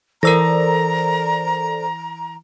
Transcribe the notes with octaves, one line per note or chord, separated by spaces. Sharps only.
E3 A4 A#4 C5 D5 A#5 E6 A#6